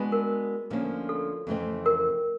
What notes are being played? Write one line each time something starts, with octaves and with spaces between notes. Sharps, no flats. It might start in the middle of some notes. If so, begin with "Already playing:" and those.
Already playing: G#3 B3 D4 F#4 B4
A#4
D2 D3 F3 A#3 C#4
A4
F2 C#3 E3 A3 C4
A#4